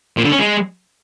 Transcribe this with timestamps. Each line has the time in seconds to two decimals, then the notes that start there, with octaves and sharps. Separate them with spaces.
0.17 A#2
0.25 D3
0.32 C#4
0.39 G#3